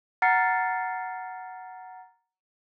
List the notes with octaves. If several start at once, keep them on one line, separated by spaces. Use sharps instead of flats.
F#5 A#5 F6 A6 C7 C#7